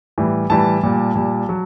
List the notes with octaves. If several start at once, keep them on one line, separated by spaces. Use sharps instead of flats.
A2 E3 G3
A2 E3 G3 A5
A#2 G3
A#2 G3
F#3